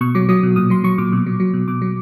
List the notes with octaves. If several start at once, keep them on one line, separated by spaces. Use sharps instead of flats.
B2 C#6
F#3 D6
F#3 D#6
B2
A#2 D#6
F#3 C6
F#3 C#6
A#2 D6
B2
F#3
F#3
B2
B2 D6
F#3